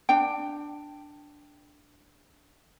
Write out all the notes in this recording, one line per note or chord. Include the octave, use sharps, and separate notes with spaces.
D4 G5